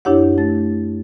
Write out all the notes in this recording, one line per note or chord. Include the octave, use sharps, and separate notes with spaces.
F#2 D4 E4 G4 C#5 F#5
A3 A6